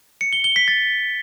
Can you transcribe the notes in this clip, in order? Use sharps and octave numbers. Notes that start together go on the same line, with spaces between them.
C#7
G7
G7
B6
A6